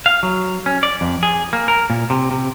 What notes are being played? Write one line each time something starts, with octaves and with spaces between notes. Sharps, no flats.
F5
F#3
C#4
D5
F2
G#4
A#3
A#4
A#2
C3
C3